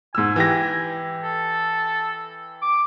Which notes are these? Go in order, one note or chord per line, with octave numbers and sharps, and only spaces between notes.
G#2 G#5 E6
E3 G4 A#6
A4
D6